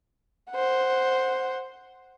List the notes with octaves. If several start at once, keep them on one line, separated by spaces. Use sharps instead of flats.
C5 F#5